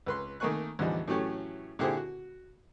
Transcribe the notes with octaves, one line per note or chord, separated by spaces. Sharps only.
C#2 B4 C6
D#3 A3 A#3 G#5 C#6 F#6
A1 E2 D3 F3 G3 D#4
A2 E3 F#3 A3 C#4 G4
A#2 D3 E4 G4 G#4 C5
F#4